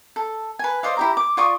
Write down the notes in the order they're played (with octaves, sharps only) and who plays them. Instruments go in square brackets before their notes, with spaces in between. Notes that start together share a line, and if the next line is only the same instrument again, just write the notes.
[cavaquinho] A4
B4 G#5
C5 D5 D#5 F5
E4 G4 A#5
D6
F4 D5 C#6 D#6